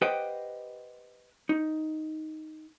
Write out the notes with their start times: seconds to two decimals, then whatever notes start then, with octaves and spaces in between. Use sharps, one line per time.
0.02 G4 B4 C5 D#5 F#5 G5
1.49 D#4